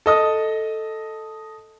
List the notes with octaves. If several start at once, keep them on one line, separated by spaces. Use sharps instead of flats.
A4 D#5 D#6